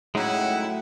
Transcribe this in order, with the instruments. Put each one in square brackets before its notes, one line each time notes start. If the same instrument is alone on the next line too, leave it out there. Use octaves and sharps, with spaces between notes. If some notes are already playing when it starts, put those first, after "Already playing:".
[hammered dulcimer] A2 F#3 G5 [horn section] C#3 E4 [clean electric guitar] G#3 D#4 [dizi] F#5